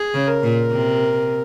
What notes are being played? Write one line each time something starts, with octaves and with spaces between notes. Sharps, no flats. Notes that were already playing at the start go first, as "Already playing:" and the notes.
Already playing: G#4
C#3
A#4
A#2
C3